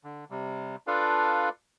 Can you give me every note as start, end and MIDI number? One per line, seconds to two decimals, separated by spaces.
0.04 0.25 50
0.30 0.76 48
0.30 0.76 55
0.87 1.49 62
0.87 1.49 65
0.87 1.49 69
0.87 1.49 71
0.87 1.49 74
0.87 1.49 77